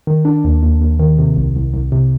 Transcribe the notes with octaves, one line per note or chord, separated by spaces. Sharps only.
D#3
D4
D#2
D#2
D#2
D#3
C3
C2
C2
C2
C3